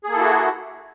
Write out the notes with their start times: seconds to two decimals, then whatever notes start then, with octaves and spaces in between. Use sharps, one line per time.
0.04 G#4
0.08 A#3
0.12 A4
0.16 E4
0.20 F#4